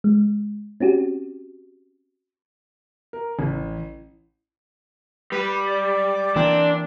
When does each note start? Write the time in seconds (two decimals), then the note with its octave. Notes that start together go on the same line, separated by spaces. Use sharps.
0.04 G#3
0.80 C4 C#4 F#4 G4
3.13 A#4
3.39 A1
5.32 G3 B4
5.67 D5
6.36 E3 A#3 C4 D4